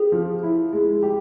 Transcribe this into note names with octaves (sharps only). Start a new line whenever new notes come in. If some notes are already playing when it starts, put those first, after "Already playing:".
Already playing: G4 G#4
F3
E4
G#3
G4